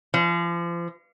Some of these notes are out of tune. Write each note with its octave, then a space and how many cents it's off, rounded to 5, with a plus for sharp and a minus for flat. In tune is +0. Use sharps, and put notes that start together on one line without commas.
F3 -35